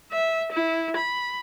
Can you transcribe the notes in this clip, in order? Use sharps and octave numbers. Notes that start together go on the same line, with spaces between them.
E5
E4
B5